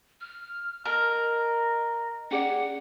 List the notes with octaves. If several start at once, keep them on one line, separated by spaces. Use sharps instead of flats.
F6
A#4 D#5 A5
C#4 G#4 D5 F#5